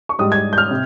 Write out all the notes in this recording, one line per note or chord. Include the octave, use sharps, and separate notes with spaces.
C#6
G#2 G3 D#6
G#6
G6
F6
C3